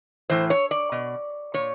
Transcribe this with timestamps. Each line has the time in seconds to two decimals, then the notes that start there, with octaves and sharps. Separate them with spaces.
0.30 A2 E3 C5
0.50 C#5
0.71 D5
0.92 B2
1.54 A#2 C#5